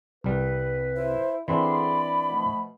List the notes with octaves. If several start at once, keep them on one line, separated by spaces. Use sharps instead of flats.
C2 G3 B4
E4 C5
D3 E3 C4 D4 G#4 D5 B5 C6
B2 F3 A3